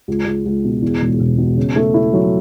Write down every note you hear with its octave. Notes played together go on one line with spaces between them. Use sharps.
C#2
C#2
C#2
B2
E2
E1
E1
B2
C#3
A3
E4
F#3